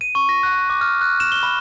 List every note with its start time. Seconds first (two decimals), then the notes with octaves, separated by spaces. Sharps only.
0.01 D#7
0.15 C#6
0.29 A#6
0.43 F#6
0.70 D6
0.81 F6
1.01 F#6
1.20 E7
1.32 G7
1.43 B5